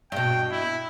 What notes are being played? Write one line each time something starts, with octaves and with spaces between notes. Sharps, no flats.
G2 B2 G5
E4